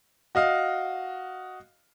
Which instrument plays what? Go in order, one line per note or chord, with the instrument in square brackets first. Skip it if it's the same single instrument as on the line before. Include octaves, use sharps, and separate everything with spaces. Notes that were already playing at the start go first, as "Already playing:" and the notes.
[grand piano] F#4 D#5 F5